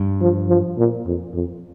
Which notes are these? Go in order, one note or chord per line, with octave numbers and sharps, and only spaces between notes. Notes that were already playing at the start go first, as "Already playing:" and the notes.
Already playing: G2
F3
F3
A#2
F2
F2